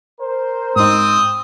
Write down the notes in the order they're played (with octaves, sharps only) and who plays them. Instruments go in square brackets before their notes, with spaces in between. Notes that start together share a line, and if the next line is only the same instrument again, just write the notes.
[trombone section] A#4 C5
[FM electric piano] G#2 D#4 [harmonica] C4 D#6